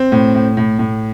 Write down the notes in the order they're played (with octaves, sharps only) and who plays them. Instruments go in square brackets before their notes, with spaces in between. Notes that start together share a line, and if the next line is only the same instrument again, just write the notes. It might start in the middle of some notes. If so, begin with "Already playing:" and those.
Already playing: [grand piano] C4
A2
A2
A2
A2